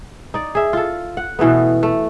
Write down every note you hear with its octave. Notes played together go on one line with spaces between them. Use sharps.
D#4 D5
G#4 E5
F4 A4
F#5
B2 E3 A3 B3
A3